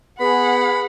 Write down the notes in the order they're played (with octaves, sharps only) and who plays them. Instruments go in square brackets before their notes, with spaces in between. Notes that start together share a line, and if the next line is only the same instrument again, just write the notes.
[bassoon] B3 [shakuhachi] G#4 [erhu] F#5 [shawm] B5